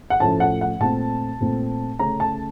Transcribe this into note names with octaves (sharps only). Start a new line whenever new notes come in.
F#5
A2 F3 A3 C#4 A5
F#5
F#5
A#2 A3 C4 A5
A#2 A3 C4
C#3 A3 C#4 A#5
A5